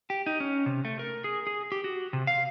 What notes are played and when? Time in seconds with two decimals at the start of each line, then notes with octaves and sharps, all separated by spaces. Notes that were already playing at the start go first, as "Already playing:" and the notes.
0.10 G4
0.26 D#4
0.40 C#4
0.66 C3
0.85 A3
0.99 A#4
1.24 G#4
1.47 G#4
1.72 G4
1.84 F#4
2.13 C3
2.27 F5